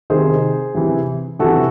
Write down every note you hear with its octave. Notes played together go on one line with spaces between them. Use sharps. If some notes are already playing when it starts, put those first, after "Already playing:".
C3 D#3 G#4 C5
C3 E3
C3 E3 F#4 A4